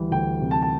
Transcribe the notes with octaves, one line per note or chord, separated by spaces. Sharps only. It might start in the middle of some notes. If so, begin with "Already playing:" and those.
Already playing: D2 E3 G3
D2 G5
C3
A5
A5